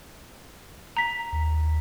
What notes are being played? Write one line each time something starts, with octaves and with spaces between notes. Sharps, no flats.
A#5 B6
D#2